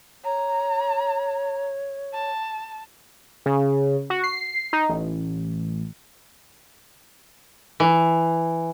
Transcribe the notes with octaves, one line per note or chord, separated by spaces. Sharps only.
C#5 A#5
A5
C#3
F#4
C7
D#4
A1
E3